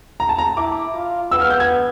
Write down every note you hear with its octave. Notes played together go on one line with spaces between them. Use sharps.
A#5
A5
A#5
E4 D6
F4
B3 E6
F6
G6
G#6